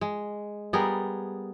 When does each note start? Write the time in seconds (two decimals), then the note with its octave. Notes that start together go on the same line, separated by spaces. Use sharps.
0.01 G#3
0.73 G3 B3 G#4 A#4